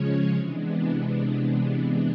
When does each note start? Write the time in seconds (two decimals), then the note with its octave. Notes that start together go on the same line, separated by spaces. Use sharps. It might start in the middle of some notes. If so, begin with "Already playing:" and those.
Already playing: C#3 F3 G#3 C#4 C#5
0.35 C3 E3 G#3 B3 D4